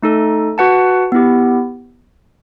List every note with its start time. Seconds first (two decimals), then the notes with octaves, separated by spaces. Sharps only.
0.02 A3 D#4 A4
0.58 F#4 B4 F#5 A5
1.12 B3 E4 G4